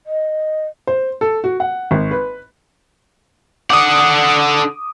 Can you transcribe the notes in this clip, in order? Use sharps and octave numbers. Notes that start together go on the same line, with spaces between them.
D#5
C5
A4
F#4
F#5
G#1
B4
D3 F#5 D6 D#6